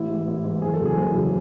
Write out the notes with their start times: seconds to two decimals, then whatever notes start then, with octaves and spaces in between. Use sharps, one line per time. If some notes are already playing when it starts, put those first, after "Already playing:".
Already playing: A1 E4
0.09 G#2 E3
0.27 A1
0.44 G#2 E3
0.62 F#1 G#4
0.74 A4
0.80 E2 C#3 F#3
0.86 G#4
0.97 F#1
1.14 E2 C#3 F#3